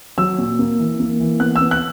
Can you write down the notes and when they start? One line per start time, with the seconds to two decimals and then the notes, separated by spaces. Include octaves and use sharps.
0.18 F#3 E6
0.38 A#2
0.59 A#3
0.79 E3
1.00 A#3
1.20 E3
1.40 B3 F#6
1.56 E6
1.61 B3
1.71 F#6